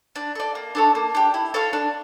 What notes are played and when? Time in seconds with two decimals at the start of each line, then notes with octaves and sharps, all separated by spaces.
0.16 D4
0.35 A4 D5
0.55 A#3
0.75 D4 A4 C#5
0.95 A#3
1.15 D4 G4
1.34 E4
1.54 A4 C#5 F5
1.73 D4